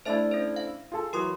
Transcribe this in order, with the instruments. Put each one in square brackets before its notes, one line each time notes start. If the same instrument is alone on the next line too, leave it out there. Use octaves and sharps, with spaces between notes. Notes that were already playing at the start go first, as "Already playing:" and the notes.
[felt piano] A3 D4 E4 [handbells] C5 E5 A6
[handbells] C#4 C5
F5
[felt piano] F4 G#4 A4
[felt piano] E3 F#3 [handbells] A#4 C6 D#6